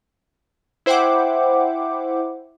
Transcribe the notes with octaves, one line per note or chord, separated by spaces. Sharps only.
E4 C5 E5 F#5 G5 D6